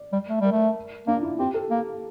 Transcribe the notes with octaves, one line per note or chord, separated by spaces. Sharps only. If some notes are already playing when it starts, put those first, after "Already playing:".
Already playing: D5
G3
A3
G3 A#4
A3
A#3 D4
F4
E4
C4 G4
A4
A#3